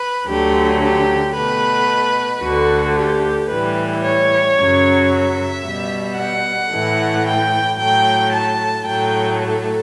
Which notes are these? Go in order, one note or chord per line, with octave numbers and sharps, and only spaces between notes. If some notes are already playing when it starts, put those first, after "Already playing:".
Already playing: B4
D2 D3 F#3 A3 G4
G4
B2 A3 B4
D2 D3 A3 F#4
G4
A2 E3 G3 B4
C#5
F#2 C#3 F#3
E5
B2 G3
F#5
A2 E3 A3
G5
A2 F#3 A3 G5
A5
A2 F#3 A3 G5
A4